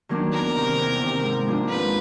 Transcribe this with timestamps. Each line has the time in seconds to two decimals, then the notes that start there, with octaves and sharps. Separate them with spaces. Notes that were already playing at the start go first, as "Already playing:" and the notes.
0.09 D#3 F#3 A#3 D4
0.32 E2 A#4
0.55 C3 D#3
0.78 E2
1.01 C3 D#3
1.23 G#2
1.46 F3 A#3 D4 F4
1.68 G#2 B4